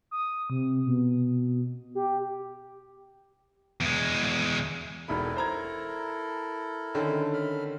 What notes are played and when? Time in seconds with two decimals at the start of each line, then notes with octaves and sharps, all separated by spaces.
0.11 D#6
0.50 C3
0.86 B2
1.95 G4
3.81 E2 G#3
5.08 E1 D#4 E4 A4 A#4 B5
5.36 C5 A#5 G#6
6.95 D3 D#3 C#4
7.33 B5 F6